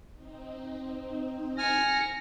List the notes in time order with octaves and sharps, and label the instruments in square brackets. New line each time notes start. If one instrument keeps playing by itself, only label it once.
[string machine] C4 D#4
[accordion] G#5 F6 [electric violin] A#6 C#7